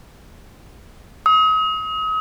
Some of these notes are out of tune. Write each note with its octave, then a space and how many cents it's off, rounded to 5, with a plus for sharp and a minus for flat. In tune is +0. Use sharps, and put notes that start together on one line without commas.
D#6 +40